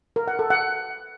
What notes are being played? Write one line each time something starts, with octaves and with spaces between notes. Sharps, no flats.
A#4
F#5
A4
F#5